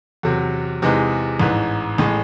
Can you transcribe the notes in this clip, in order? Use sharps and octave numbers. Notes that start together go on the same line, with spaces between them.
E2 C3 F#3
E2 C3 E3 G#3 D#4
A1 G#2 E3
A1 A2 G#3